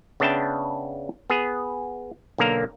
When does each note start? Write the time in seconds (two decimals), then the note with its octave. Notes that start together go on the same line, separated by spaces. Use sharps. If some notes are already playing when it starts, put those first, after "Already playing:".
0.20 C#3 B3 D4 E5 G5 A5
1.30 B3 G#4
2.38 B1 D3 A#3 A#4